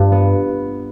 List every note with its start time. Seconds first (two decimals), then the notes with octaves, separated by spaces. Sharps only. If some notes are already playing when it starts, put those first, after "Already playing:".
Already playing: G2 F4
0.12 B3